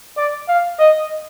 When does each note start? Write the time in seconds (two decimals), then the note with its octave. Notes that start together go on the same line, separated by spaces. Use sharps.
0.17 D5
0.48 F5
0.79 D#5